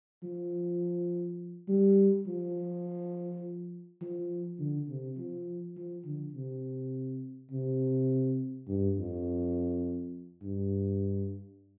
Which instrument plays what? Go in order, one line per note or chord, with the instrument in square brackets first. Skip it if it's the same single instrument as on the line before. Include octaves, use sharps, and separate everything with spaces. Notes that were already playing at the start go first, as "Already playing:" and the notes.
[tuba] F3
G3
F3
F3
D3
C3
F3
F3
D3
C3
C3
G2
F2
G2